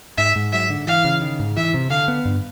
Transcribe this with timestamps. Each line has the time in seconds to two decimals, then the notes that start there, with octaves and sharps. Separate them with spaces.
0.18 G#2 E5
0.36 G#2
0.53 F#3 E5
0.70 D3
0.87 E3 F5
1.05 C#3
1.22 D#3
1.40 G#2
1.57 E3 E5
1.74 C3
1.90 D3 F5
2.08 B3
2.25 G2